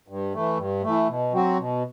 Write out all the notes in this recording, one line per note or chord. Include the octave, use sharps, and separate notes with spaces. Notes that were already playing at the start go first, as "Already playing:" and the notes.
G2
E3 A3
G2
E3 A3
B2
F#3 C4 F#4
B2